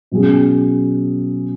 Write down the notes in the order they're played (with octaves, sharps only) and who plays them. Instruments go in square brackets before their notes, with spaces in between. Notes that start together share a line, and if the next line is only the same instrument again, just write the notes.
[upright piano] B2 F#3 C#4 G#4